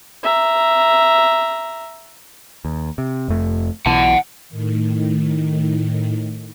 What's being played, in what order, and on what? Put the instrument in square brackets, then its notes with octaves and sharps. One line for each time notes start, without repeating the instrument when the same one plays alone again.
[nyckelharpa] E5 A#5
[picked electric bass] D#2
C3
F1 F2 A3
[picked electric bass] B1 B2 E3 [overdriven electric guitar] F#5 A5
[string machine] A2 D#3